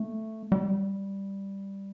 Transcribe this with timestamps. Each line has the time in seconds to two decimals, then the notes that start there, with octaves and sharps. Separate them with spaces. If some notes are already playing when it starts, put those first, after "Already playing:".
Already playing: A3
0.52 G3